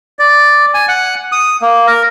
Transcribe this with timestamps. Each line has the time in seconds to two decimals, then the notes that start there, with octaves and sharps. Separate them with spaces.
0.19 D5
0.74 G#5
0.88 F#5
1.32 D#6
1.62 A#3
1.87 A#4